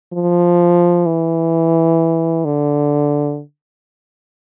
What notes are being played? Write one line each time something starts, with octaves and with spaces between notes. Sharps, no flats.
F3
E3
D3